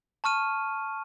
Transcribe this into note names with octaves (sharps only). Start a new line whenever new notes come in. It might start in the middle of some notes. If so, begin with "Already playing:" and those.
A5 C#6 F6 D#7